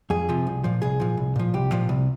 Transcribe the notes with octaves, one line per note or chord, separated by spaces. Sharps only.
F2 G#4
C3 F3
C2
A#2 F3
C2 G#4
A#2 F3
C2
A#2 F3
C2 G4
A#2 F3
C2